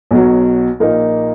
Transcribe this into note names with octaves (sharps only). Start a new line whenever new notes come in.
B1 B2 F#3
A#1 A#2 A#3 D#4 A#4